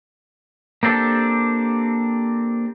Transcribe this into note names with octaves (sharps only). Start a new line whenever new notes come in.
A#3 C4 D4 G4 A4